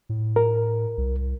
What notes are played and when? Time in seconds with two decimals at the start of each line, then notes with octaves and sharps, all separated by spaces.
0.09 A2
0.36 A#4
0.98 C2